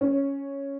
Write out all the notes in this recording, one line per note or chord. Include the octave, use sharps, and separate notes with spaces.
C#4